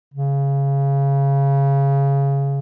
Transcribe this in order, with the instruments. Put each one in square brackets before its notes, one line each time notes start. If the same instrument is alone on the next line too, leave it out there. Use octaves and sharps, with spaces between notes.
[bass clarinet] C#3